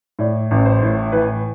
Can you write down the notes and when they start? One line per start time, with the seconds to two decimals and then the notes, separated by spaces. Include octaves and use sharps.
0.19 A2 D5
0.51 A1
0.65 C5
0.82 A2
1.12 E3 B4